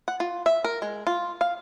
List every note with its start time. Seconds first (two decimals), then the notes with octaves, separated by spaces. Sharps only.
0.08 F#5
0.20 F4
0.46 E5
0.64 A#4
0.82 G#3
1.07 F4
1.41 F5